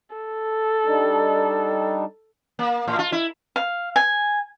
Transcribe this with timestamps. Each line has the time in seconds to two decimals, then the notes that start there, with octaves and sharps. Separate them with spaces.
0.16 A4
0.85 G3 D4 D#4
2.59 A#3
2.87 A2
2.99 F4
3.12 E4
3.56 F5
3.96 G#5